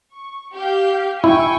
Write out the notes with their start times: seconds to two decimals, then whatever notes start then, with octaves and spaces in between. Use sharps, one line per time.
0.13 C#6
0.53 G4 F5 G6
1.24 E4 G5 G#5 C#6